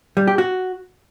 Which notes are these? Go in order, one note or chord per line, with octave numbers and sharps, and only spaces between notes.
G3
G4
F#4